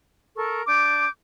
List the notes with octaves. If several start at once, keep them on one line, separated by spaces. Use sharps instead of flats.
A4 A#4 C#6
D4 D6 G6